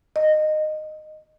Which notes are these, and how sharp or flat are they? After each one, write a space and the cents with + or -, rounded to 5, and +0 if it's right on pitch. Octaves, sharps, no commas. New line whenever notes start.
D#5 -15